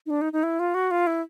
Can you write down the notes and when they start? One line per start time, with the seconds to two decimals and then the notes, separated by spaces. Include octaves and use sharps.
0.06 D#4
0.10 D4
0.21 D#4
0.33 D#4
0.43 E4
0.60 F4
0.74 F#4
0.91 F4
1.07 E4